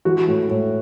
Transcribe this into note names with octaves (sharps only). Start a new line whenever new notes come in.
E3 F#4
A2
A2